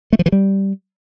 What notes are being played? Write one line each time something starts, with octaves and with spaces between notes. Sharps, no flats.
A3
F3
E3
G3